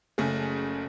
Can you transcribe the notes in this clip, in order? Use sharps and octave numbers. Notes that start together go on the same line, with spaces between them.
F#1 C#3 A3 G#4